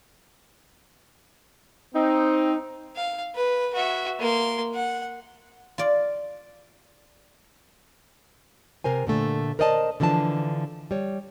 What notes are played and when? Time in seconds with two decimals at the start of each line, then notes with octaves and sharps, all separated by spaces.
1.94 C4 D#4
2.96 F5
3.35 B4
3.74 F#4 E5
4.19 A#3 C6
4.74 F#5
5.78 F4 D5
8.84 C3 A#4 C5 G#5
9.07 A#2 D3 A3
9.59 A#4 C5 D5 D#5 F#5 A5
10.00 D3 E3 F3 D4 A5
10.91 G3 C#5